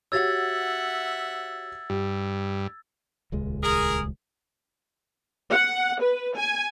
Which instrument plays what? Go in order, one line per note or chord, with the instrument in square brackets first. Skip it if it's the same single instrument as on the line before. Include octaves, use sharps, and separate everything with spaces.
[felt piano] F#4 G4 C#5 [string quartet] E5 F#5 [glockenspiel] E6 G#6 A6
[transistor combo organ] G2 [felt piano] G4
[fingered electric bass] D#1 C#2 G#3
[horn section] G#4 A#4
[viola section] F#5
B4
G#5